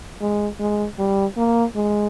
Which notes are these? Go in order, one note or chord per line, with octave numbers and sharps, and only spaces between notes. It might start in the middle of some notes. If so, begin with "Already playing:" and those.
G#3
G#3
G3
A#3
G#3